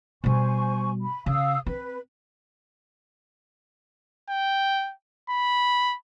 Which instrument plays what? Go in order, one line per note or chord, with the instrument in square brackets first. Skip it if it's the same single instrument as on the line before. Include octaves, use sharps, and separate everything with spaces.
[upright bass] B2 G3 [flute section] C5 G#5 C#6
[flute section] B5
[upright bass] C#3 [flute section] F5 D#6 E6
[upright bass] C4 [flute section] B4
[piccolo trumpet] G5
B5